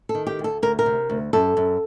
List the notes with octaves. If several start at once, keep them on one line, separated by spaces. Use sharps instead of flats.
A4
D#3
G4
D2
A4
D2 A#4
A#4
C3
D2
F#2 A4
F#2